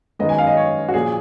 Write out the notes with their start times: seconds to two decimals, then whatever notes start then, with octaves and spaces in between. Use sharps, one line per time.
0.19 F#2 D#3 G#3 B3 D#5
0.29 G#5
0.38 F5
0.47 D#5
0.57 C#5
0.89 F#4
0.94 A#2 F3 G#4